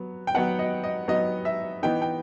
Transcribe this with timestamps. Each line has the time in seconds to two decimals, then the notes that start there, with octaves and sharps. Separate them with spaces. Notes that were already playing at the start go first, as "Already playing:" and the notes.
Already playing: F#3 B3
0.27 G5
0.34 F#3 B3 D#4 F#5
0.59 D#5
0.84 D#5
1.08 F#3 B3 D#4 D#5
1.45 E5
1.83 E3 B3 D#4 G5
2.02 G5